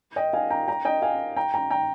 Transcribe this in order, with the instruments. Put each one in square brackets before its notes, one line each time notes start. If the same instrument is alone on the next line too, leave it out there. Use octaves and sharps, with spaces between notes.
[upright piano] D#5 G5
F5 G#5
G5 A#5
G5 A#5
D#5 G5
F5 G#5
G5 A#5
G5 A#5
G5 A#5